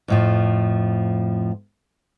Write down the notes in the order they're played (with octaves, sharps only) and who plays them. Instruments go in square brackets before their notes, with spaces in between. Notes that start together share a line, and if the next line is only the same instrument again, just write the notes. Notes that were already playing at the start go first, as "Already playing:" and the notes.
[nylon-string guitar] F2 A2 F3